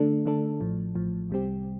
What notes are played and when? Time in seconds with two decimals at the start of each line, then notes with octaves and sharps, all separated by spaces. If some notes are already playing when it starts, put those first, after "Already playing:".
Already playing: D3 A3 D4 A4
0.25 D3 A3 D4 A4
0.60 A1 A2 F3
0.95 A1 A2 F3
1.30 C2 C3 G3 C4 G4